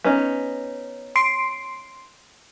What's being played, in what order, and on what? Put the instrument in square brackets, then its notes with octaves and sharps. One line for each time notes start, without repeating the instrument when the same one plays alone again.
[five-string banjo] B3 C#4 D#4
[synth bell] C6 C7 D7